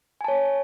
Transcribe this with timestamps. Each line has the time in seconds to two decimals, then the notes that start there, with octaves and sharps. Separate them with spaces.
0.21 G#5
0.24 A5
0.28 C#5